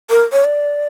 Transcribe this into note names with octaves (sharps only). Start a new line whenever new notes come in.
A#4
C#5
D5